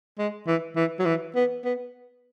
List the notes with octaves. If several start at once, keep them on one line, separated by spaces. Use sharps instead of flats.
G#3
E3
E3
F#3
E3
B3
B3